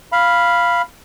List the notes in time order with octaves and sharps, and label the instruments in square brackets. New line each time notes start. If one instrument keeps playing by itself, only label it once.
[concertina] F5 B5